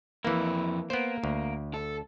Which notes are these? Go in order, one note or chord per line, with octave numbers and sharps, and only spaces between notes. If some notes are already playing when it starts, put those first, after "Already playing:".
F2 E3 A#3 E4
A#3 B3 C5
D2
A4